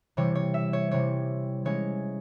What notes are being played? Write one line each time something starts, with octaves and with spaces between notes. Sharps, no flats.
C3 E3 G3 C#5
C#5
E5
C#5
C3 E3 G3 C4 C#5
E3 G#3 C#4 C#5